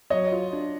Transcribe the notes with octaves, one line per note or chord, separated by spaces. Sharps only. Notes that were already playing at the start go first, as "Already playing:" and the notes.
F#3 C#5 D#5
F4
D4